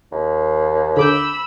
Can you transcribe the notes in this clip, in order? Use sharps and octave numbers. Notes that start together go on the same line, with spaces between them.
D#2
D3 B5 D6 E6 G6